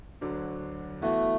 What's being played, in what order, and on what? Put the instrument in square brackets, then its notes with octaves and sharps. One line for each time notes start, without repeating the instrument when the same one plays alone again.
[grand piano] D2 D3 F#3 D4
[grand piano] E3 B3 F#4 [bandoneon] A3